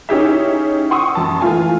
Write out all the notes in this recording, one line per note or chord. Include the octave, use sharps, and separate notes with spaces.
C#4 D#4 E4 G4 G#4 E5
F#5 G5 C6 C#6 D#6 E6
F#2 A5
E3 A3 F4 G#5